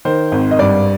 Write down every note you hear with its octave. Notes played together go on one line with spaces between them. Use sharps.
D#3 C5
G#1
D#5
G2 D5